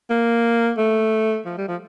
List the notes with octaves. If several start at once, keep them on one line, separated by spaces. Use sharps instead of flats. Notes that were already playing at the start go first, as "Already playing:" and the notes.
A#3
A3
F3
G3
F3